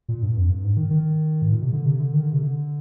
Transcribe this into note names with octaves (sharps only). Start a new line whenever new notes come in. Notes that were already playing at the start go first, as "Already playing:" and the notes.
A#2
G2
F2
G2
G#2
D#3
D#3
G#2
A#2
C3
D3
C3
D3
D#3
D3
C3
D3